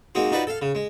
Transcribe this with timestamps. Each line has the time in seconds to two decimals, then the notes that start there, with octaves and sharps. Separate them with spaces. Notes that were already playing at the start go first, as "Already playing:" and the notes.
0.15 G#3 A#3 C4 D#4 F#4
0.32 D#4 F4 F#4 B4 C5 D5
0.47 A4 F5
0.62 C#3
0.75 G#3